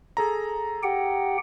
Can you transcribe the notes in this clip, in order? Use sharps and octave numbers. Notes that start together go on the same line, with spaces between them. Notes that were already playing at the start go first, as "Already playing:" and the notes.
G#4 A4 A#5
G4 F#5 G5